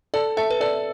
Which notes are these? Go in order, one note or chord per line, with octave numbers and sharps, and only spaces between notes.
A4 D5
A4 E5
B4
A4 D5